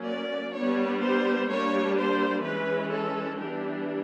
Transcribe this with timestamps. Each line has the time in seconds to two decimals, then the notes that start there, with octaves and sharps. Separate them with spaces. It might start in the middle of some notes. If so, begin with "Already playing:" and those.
Already playing: F#3 A#3 C#4
0.08 D5
0.55 G3 B3 D4 C#5
1.03 C5
1.50 G3 A#3 D4 C#5
1.97 C5
2.44 E3 G#3 C#4 B4
2.92 A4
3.39 E3 G3 B3 D4 G4